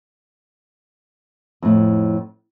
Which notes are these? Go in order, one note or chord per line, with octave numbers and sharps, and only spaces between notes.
F2 A2